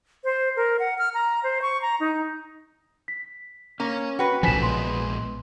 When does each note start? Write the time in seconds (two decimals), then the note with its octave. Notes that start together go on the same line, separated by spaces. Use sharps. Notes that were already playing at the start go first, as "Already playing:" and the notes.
0.24 C5
0.56 A#4
0.79 F#5
0.98 F6
1.14 A#5
1.43 C5
1.62 C#6
1.82 A#5
2.00 D#4
3.08 B6
3.80 A#3 C#4
4.19 F#4 B4 G5
4.43 A#1 A2 C#3 F3 A3 G#5 B6 E7
4.63 G#3 B3 C6